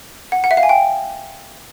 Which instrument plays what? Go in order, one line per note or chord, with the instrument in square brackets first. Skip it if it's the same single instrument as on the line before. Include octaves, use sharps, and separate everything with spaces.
[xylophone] F#5
F#5
E5
F5
G#5
G5